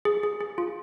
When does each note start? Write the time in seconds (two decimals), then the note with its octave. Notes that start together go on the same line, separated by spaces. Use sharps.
0.05 G#4
0.23 G#4
0.40 G#4
0.58 F4